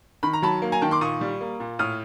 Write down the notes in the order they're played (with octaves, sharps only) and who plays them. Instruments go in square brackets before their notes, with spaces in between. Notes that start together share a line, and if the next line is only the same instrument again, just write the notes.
[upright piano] D#3 B5
A#5
F#3 A5 B5
A#3
G#5 A#5
D#3 G5 A5
C6 D6
A#2 C#6 D#6
G3
A#3
A#2
A2 D#6 F6